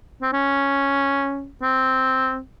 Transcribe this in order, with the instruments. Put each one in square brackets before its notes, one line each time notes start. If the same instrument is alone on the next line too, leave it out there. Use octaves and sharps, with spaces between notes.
[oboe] C4
C#4
C4